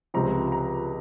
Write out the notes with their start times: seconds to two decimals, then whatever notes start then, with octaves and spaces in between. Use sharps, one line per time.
0.14 C#2 C3 F3 C4 A#5
0.52 A#5